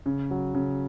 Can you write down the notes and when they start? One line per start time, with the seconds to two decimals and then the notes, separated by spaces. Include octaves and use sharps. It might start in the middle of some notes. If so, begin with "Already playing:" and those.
0.06 C#3
0.31 F#3
0.54 C#3